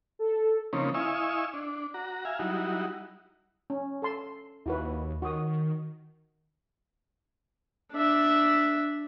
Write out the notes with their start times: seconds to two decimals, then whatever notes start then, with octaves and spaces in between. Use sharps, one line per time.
0.19 A4
0.73 C#3 F3 A#3 C4 C#4 D#4
0.94 E4 D#5 F5 G#5 C#6 E6
1.53 D4
1.94 F#4 A#5
2.25 E5 F5 G#5
2.39 F#3 G3 D#4 E4 F#4
3.70 C#4
4.02 A4 A5 C6
4.66 D#2 E4 F#4 B4
5.22 D#3 F#4 D#6
7.92 D4 E5